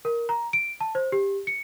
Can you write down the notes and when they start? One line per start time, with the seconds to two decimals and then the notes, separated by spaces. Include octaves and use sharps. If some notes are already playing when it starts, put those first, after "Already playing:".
0.05 A#4
0.29 A#5
0.53 D7
0.81 A5
0.95 C5
1.12 G4
1.47 C#7